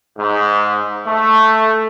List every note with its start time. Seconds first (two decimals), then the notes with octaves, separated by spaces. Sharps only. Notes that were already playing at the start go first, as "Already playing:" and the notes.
0.18 G#2
1.07 A3